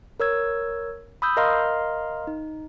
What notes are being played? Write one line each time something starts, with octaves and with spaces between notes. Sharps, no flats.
A#4 C#5 E6 G#6
B5 D#6 E6 G6
A#4 D#5 F5 A#5 C6 F6
D#4